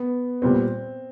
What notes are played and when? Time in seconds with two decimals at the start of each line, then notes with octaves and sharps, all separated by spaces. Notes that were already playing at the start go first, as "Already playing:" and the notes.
Already playing: B3
0.42 A#2 G3 B3 C4